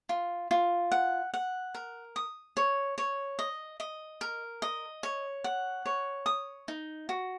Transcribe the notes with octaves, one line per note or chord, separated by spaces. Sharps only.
F4
F4
F#5
F#5
A#4
D#6
C#5
C#5
D#5
D#5
A#4
D#5
C#5
F#5
C#5
D#6
D#4
F#4